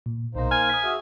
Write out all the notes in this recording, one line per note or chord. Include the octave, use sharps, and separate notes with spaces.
A#2
B1 B2 A#3 D#4 C5 A#5
G#5 F6
D#6 F6 B6
F#4 G#4 E5